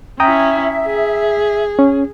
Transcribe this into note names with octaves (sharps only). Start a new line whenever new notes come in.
C#4 E4 E5 G5 A#5 D#6
G#4
C#4